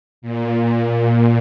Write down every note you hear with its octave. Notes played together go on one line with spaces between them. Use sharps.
A#2